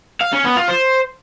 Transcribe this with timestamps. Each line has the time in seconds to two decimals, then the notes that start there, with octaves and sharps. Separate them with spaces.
0.21 F5
0.33 C#4
0.44 B3
0.56 F4
0.68 C5